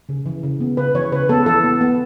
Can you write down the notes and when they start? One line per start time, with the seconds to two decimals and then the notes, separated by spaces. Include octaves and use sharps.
0.09 C#3
0.26 E3
0.43 C#3
0.60 B3
0.77 C#3 B4
0.95 E3 C#5
1.12 C#3 B4
1.29 B3 A4
1.46 E3 A4
1.64 B3
1.81 B3